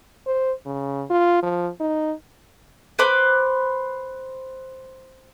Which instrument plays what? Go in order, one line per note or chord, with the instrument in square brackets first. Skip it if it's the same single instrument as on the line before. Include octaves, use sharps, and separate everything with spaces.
[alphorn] C5
C#3
F4
F3
D#4
[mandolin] B4 C5 B5 D6